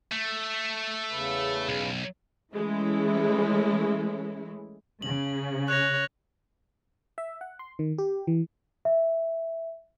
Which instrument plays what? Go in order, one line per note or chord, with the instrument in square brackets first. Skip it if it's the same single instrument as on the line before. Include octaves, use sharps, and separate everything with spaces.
[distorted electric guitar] A3
[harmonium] E2 C#3 B4
[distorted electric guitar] B1
[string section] E3 G#3 A3 C#4 E4
[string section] C#3 [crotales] F#7
[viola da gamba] C#5 [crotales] F#6 A#6
[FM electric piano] E5
F#5
C6
D#3
G4
E3
[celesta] E5